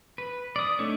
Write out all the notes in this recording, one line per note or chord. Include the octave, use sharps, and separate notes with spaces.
B4
D5 D#6
A3 D4 D#4 A4 C#5